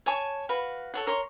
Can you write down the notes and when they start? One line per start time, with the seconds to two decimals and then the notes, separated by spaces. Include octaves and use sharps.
0.06 C#5 G#5 A5 C#6
0.49 F#4 B4 F5
0.94 A4 C#5 F#5
1.07 A#4 C#5 C6 C#6